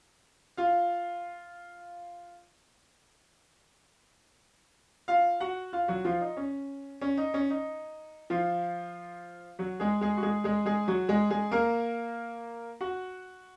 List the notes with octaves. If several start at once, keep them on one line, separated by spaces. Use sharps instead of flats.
F4 F5
F4 F5
F#4 F#5
F4 F5
F#3 F#4
F3 F4
D#4
C#4
C#4
D#4
C#4
D#4
F3 F4
F#3 F#4
G#3 G#4
G#3 G#4
F#4
G#3 G#4
G#3 G#4
G#3 G#4
F#3 F#4
G#3 G#4
G#3 G#4
A#3 A#4
F#4 F#5